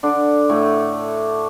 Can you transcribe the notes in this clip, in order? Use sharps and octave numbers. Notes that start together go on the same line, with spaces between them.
D3 D4
A2 A3